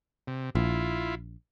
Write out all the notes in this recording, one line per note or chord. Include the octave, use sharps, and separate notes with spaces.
C3
A#1 E4 F4